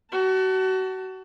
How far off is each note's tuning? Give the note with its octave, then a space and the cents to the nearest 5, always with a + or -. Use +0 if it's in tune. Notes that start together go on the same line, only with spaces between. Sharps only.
F#4 +30 A5 +15